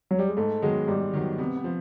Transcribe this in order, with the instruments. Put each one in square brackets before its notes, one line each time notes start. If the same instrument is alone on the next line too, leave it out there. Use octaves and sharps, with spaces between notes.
[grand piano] F#3
G3
G#3
[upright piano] G#2 [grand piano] A3
[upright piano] D#3 F#3 B3 [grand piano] G#3
[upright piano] G#2 [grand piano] G3
[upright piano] D#3 F#3 B3
[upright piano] C3 [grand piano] B3
[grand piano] B3
[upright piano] F3